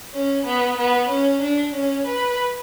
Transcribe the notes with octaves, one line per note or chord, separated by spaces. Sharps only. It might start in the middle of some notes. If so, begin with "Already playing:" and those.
C#4
B3
B3
C#4
D4
C#4
B4